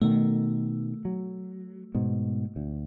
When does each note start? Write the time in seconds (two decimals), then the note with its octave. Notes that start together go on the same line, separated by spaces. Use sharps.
0.02 B2 D#3 A3
1.05 F#3
1.95 G#2 B2
2.56 D2